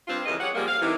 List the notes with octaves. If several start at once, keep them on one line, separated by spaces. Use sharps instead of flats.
G2 C4 F4
F2 C#3 E3 G3 A#4 D#5
G4 G#4 C#5 F#5
C#3 F3 G3 G#3 A#3
F5
C3 D#3 E3